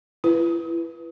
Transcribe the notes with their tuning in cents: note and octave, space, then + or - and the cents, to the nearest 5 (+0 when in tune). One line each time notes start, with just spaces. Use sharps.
E4 +35 B4 +0